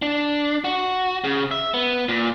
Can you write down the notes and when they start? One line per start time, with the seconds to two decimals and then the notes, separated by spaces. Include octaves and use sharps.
0.02 D4
0.64 F#4
1.24 C#3
1.51 E5
1.74 B3
2.09 A#2